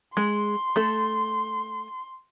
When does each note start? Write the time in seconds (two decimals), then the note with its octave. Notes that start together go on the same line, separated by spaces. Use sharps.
0.17 G#3 C6
0.76 A3 A4